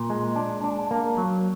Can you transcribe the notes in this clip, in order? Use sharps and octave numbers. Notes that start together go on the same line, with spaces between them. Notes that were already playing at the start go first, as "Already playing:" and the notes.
Already playing: A#2
G#3
D4
D4
A#3
F#3